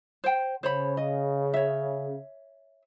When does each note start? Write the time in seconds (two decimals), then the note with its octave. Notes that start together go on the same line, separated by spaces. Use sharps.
0.24 C5 G5
0.63 C#3 C5 C#5 B5
0.97 D#5
1.54 C#5 E5